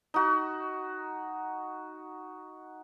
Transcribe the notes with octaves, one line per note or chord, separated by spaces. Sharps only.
D#4 F#4